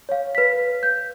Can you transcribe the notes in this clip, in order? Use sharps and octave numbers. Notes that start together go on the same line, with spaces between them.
C#5 F5
B4 B6
G6